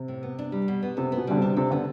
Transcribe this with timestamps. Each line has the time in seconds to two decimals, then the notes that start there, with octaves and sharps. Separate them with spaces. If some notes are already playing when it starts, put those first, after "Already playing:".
Already playing: C3
0.08 A2
0.23 B3
0.39 D4
0.52 G3
0.68 B2
0.82 B3
0.97 C3 A4
1.12 B3
1.17 B2
1.27 D3 G3
1.37 C3 D4
1.57 C3 A4
1.71 D3 B3